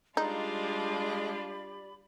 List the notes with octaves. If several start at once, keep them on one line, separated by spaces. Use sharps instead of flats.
G3 G#3 D4 D#4 F4 G4 D5 B5